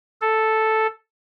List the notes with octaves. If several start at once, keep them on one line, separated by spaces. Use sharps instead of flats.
A4